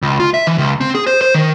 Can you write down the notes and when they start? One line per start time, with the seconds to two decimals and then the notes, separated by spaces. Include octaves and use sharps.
0.02 C#2
0.20 F4
0.34 E5
0.47 E3
0.58 C#2
0.81 C4
0.95 G#4
1.07 C5
1.21 C5
1.34 D#3